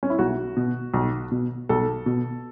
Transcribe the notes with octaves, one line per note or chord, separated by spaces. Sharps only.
C#4
E4
B1 F#4
B2
B1
B2
B1 A4
B2